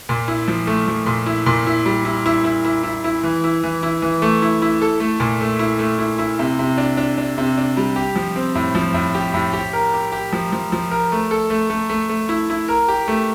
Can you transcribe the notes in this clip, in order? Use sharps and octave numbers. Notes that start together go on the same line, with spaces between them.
A#2
E4
F3
A3
F3
A#2
E4
A#2
E4
G3
E4
E4
E4
E4
E4
E4
E3
E4
E3
E4
E3
A3
E4
E4
A4
A3
A#2
A3
E4
A3
E4
E4
C3
C3
D4
D4
D4
C3
D4
G3
G4
F3
C4
A2
F3
A2
G4
A2
G4
A#4
G4
G4
F3
F3
F3
A#4
A3
A4
A3
A3
A3
A3
E4
E4
A#4
G4
A3